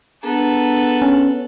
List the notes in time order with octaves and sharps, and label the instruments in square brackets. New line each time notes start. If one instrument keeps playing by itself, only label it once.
[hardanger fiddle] B3 A4 [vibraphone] D4 G#4 A#5
[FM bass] C#4